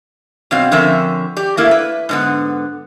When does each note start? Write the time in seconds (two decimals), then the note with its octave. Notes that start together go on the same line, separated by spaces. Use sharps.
0.51 B2 F#3 C4 F5
0.72 D3 F3 C4 C#4 A#4 E5
1.37 G4 D5
1.57 A3 A#3 E4
1.71 B4
2.09 G#2 D3 B3